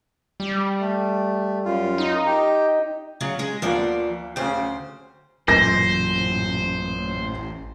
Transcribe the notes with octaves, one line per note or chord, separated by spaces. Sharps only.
G3
A3
F#2 F4
D#4
G4
C#3 F#3
G#3 G#4
D2 F3 A#3 B3 D5
D2 C#3 C#4 C5 G5
A1 F#2 A#2 C5 A#6